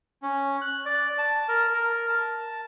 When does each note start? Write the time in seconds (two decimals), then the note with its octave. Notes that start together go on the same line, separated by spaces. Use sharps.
0.22 C#4
0.61 F#6
0.85 D5
1.18 A5
1.49 A#4
1.74 A#4
2.09 A5